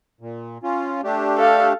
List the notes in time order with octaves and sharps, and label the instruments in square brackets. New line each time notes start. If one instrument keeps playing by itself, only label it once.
[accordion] A#2
C#4 F4
A3 D4 G4
[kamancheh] A4 F5